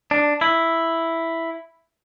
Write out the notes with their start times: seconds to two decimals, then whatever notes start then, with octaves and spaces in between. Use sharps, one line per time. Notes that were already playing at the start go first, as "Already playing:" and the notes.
0.11 D4
0.41 E4